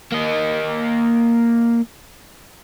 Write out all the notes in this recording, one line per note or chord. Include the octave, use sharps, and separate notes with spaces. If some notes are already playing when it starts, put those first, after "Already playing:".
A#3 D#5